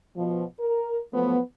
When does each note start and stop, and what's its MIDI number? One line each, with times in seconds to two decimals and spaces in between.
0.17 0.43 47
0.17 0.43 53
0.60 1.00 70
1.13 1.38 53
1.13 1.38 54
1.13 1.38 57
1.13 1.38 59